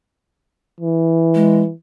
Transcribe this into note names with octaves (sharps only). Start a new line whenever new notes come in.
E3
G#3